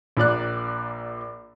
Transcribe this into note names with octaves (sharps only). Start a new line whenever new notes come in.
A#1 A#2 D5 F#6